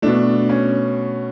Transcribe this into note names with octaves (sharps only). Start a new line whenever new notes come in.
B2 A3 D4
C#4